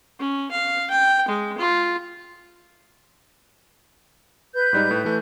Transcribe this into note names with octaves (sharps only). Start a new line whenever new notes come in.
C#4
F5
G5
G#3
F4
B4 G6
G#2 G3 D#4
A2
E3 A3